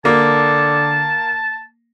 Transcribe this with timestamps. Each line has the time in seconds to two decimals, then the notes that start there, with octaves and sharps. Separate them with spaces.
0.05 D3 A#3 A5